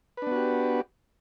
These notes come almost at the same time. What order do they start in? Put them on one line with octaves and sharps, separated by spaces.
B4 D4 B3 F#4 G4